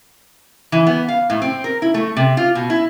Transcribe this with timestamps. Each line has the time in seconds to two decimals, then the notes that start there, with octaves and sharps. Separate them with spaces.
0.72 E3
0.86 B3
1.08 F5
1.30 A2
1.42 C4
1.64 A#4
1.82 E4
1.94 A3
2.16 C3
2.37 F4
2.55 B2
2.70 E4